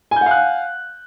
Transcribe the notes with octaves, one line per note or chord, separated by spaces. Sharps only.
F5 F#5 G#5 F#6 G6